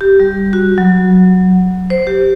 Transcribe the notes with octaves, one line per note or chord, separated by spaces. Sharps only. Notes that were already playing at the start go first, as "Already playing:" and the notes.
G4
G3
F#4
F#3
C5
G4